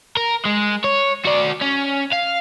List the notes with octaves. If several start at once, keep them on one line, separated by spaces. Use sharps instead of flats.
A#4
G#3
C#5
F#4 D5
C#4
F5